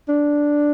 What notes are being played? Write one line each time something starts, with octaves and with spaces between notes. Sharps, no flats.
D4